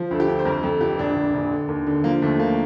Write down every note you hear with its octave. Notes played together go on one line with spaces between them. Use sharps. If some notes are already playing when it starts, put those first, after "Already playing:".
Already playing: F3
D2 A4
G4
D2
C5
F2 A#4
F2 A4
F1 G4
A#1 D4
A#1
A#1
D3
D#2
D3
F3 A#3
D#2 A3
D3 A#3